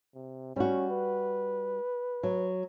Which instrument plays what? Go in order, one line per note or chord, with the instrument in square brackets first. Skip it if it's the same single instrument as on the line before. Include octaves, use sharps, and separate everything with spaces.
[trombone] C3
[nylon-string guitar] G3 F#4 [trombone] C#4
[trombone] B4
[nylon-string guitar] F#3